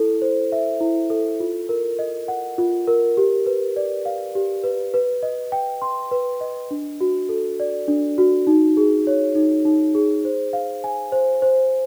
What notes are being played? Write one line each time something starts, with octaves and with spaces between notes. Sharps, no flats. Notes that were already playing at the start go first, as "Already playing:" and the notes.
Already playing: E4 A4
C5
E5
E4
A4
F4
A#4
D#5
F#5
F4
A#4
G4
B4
D5
F5
G4
B4
B4
D#5
G5
C6
B4
D#5
D4
F#4
A4
D5
D4
F#4
D#4
G#4
C#5
D#4
D#4
G#4
C5
F5
G#5
C5
C5